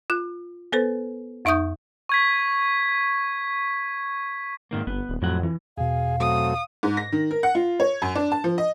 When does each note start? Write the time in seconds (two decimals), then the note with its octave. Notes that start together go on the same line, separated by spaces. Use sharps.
0.10 F4 F#6
0.72 B3 A4 B4 C5
1.45 F2 D#4 E5 C#6 D#6 G6
2.09 C#6 G#6 B6
4.71 G#2 D#3 A#3
4.87 G1 B3
5.09 D#1
5.22 F2 A2 F#3 F#5
5.43 E3
5.78 E2 B2 G#4 F5
6.20 F#3 A3 C4 D#6
6.83 G#2
6.97 A#6
7.12 D#3
7.31 A#4
7.43 F#5
7.55 F4
7.80 C#5
8.02 F#2
8.15 D4
8.32 A5
8.44 F3
8.58 D#5